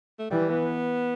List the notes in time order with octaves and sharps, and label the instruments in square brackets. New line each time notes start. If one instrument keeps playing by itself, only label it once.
[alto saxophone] A3
[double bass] E3 [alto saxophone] G3
[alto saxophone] B3